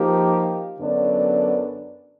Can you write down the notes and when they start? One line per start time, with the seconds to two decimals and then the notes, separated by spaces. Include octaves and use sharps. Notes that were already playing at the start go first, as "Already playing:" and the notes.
Already playing: F3 A#3 D#4 G4
0.80 F#2 D3 F#3 B3 D4